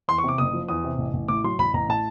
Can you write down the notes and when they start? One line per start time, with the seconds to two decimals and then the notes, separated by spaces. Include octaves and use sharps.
0.08 E2 C6
0.18 C#6
0.24 C3 D6
0.38 F#1 D#6
0.53 F3
0.68 E2 D#6
0.84 C3
0.98 A1
1.13 A1
1.28 A2 D6
1.44 F#3 C6
1.58 A1 B5
1.74 A1 A#5
1.89 A2 A5